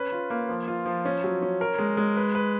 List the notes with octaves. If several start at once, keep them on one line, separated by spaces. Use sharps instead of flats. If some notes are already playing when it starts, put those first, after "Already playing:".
Already playing: C#4 B4
F4
A#3
F3
F4
F3
C#4
F#3
C#4
A#4
G#3
G#3
B4
B4